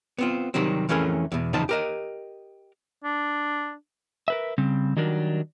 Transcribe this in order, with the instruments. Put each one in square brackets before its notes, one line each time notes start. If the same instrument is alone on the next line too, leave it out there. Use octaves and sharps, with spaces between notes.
[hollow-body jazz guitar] B3 C4 F4
C3 D#3 F#3 G3 C4
F2 E3 A3 C#4 G#4 A#4
E2 B2
E2 C#3 F3 D#4 C5 A5
G4 A#4 D#5
[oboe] D4
[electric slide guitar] A#4 B4 E5
C#3 G3 C4
D#3 F#3 G3 D4 F#4 A#4